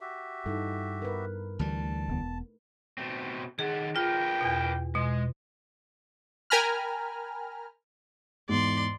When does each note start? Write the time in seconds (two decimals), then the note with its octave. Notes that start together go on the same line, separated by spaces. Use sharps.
0.01 F#4 G4 E5
0.46 G2 D#4 E4 A4
1.02 A#4 B4
1.59 D2 E3 G3 A3 A5
2.09 E1 B3
2.98 B2 A3 C4
3.59 D#3 G#4 A4 F#5
3.96 D4 F4 A#4 B4 G5
4.41 E2 B2
4.95 B2 G#3
6.50 A#4 G5 G#5 A#5 B5 F6
8.49 E2 G#2 D5 C6